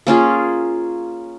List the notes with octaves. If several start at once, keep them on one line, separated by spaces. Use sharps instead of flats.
A#3 C#4 F4 G#4